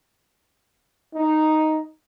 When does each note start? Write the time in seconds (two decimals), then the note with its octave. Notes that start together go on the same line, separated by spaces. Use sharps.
1.14 D#4